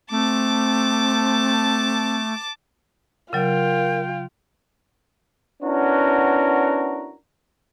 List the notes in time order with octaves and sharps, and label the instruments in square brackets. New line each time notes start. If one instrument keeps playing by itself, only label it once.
[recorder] A3 [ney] C4 [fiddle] A5 D6
[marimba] C#3 F#3 [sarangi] F4 [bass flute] A#4 [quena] G5
[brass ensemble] B3 C#4 D4 E4 F#4 A#4